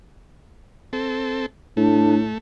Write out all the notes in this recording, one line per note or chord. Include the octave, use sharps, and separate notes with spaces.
C4 A4
A2 A3 D4